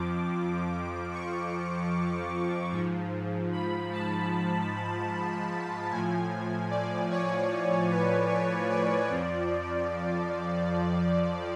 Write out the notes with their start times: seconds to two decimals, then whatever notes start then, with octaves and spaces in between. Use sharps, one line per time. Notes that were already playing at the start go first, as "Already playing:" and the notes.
Already playing: F2 F3 D6
1.12 C#6
2.72 G#2 F3
3.52 B5
3.92 A5
5.91 A2 F3 G#5
6.71 D5
7.11 C#5
7.90 B4
8.31 C#5
8.70 D5
9.10 F2 F3